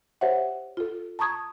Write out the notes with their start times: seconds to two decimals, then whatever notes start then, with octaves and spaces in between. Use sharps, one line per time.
0.21 G4 C5 C#5 E5 F#5
0.77 F4 A4
1.19 A5 A#5 C#6 D#6 G#6